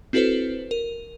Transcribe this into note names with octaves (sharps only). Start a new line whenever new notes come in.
C4 E4 F#4 A4 B4 C5
A#4